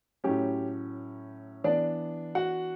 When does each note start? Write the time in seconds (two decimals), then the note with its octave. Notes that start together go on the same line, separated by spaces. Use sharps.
0.24 A2 F#3 C#4 G4
1.64 E3 B3 D4 D5
2.35 F#4 F#5